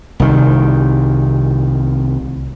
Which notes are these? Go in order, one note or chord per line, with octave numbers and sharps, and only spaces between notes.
C2 D#3